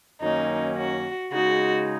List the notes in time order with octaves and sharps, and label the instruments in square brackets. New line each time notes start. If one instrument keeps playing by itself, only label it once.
[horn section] F#2 D#3 F#3 A#3 C#4 [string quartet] D#4
[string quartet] F#4
[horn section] C#3 G#3 D#4 [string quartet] F#4